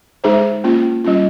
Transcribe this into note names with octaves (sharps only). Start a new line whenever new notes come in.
G#3 D#4 G#4 C5
A#3 C#4 F4
G3 C#4 F4